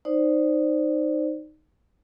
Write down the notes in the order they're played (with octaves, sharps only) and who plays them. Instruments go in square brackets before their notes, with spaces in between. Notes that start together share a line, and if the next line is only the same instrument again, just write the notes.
[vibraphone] D#4 C5 D5